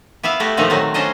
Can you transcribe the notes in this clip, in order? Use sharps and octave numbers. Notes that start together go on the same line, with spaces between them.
B3 E4 E5 F5
A3 F#4 G4
A#2 D3 D#3 F3 A3 D#4
D#3 F#3 C4
C#4 D4 C5 D#5